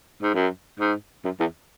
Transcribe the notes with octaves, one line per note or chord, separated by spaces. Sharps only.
G#2
F#2
G#2
F#2
E2